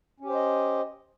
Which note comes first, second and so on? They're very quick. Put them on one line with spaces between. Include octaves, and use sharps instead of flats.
C#4 G4 C5 D#5